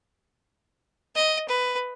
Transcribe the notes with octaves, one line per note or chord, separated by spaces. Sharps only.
D#5
B4